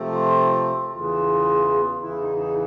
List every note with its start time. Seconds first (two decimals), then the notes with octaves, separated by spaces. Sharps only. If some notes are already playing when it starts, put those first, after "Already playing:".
Already playing: C3 F3 A3 C4
0.12 F4
0.93 E2 C#3 E3 F4
2.01 E2 C#3 E3 E4
2.20 D#4
2.38 D#4